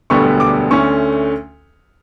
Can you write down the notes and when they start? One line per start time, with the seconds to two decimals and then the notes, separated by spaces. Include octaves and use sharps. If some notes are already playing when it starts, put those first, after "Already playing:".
0.10 E1 D2 D3 G3 B3 C#6
0.40 D6
0.71 D2 D3 A3 C#4 C#6